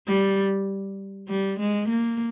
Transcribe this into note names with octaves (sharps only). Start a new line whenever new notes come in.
G3
G3
G#3
A#3